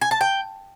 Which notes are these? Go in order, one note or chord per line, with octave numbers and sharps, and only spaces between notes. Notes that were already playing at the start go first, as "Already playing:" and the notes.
G#5
A5
G5